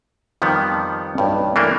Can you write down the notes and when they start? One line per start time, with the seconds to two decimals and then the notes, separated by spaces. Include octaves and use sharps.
0.42 F2 D#3 F3 G3 B3
1.18 B1 G2
1.56 E3 A3 A#3 D4